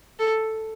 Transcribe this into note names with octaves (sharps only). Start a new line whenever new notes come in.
A4